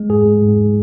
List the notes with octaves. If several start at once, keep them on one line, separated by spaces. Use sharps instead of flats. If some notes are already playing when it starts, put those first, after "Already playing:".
Already playing: G#3
G#2 G#4
G#3
G#2